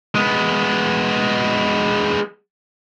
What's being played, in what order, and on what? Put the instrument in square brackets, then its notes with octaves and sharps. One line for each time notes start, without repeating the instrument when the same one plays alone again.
[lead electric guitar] G#3 B3